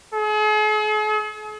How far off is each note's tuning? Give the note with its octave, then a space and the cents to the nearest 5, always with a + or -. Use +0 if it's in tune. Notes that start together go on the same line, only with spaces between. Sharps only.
G#4 +45